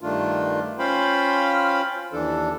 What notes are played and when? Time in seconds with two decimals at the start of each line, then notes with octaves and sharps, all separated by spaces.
0.01 G2 D#3 A3 D4 F4
0.79 C#4 F4 C5 F5 G5 B5
2.13 D#2 E3 D4 A4